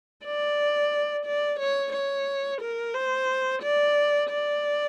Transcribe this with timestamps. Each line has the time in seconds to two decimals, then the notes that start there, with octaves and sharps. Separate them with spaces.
0.25 D5
1.25 D5
1.60 C#5
1.93 C#5
2.61 A#4
2.94 C5
3.62 D5
4.29 D5